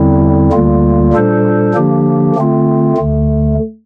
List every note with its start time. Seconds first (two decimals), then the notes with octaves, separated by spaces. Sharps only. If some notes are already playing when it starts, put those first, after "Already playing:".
Already playing: E2 D3 G3 C4 E4
0.52 D2 D3 G3 A#3 F4
1.13 A#2 G3 D4 A4 C5
1.74 D3 F3 A#3 D4 G4
2.35 D3 A3 C4 F4
2.97 D2 D3 A3